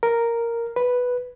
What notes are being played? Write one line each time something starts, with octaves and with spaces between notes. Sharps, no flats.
A#4
B4